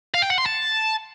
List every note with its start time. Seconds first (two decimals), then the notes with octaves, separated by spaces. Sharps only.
0.14 F5
0.22 G5
0.30 F#5
0.38 C6
0.46 A5